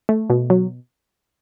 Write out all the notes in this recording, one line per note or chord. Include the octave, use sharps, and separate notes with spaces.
A3
B2
F#3